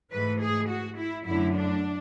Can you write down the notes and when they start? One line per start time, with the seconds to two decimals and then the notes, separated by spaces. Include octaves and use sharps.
0.12 G#2 E3 A3 B4
0.40 G#4
0.68 F#4
0.97 E4
1.26 F#2 D3 A3 E4
1.54 D4